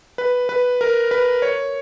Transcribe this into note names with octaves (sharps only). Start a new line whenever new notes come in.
B4
B4
A#4
B4
C#5